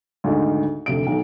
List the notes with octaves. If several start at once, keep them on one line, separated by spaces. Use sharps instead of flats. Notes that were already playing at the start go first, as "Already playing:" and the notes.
D2 G#2 D#3 D#4
F1 D2 C3 D7
B1 D#3